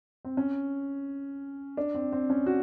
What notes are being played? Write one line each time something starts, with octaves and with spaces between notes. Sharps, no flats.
C4
C#4
D4
C4
C4
C#4
F#4